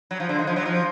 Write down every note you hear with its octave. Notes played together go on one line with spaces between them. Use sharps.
F#3
F3
D3
D#3
F3
F#3
F3